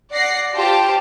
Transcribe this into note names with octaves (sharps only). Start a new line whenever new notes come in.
D5 F#5 A#6 C7
F4 G4 C5 G5 A5